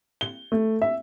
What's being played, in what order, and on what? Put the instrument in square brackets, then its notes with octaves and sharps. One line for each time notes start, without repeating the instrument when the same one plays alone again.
[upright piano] G7
A3
E5